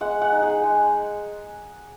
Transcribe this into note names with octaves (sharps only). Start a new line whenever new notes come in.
G#3 F#5
F#5
D#4
G#4
G#3